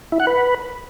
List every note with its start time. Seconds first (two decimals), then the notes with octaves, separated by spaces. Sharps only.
0.12 E4
0.20 F#5
0.27 B4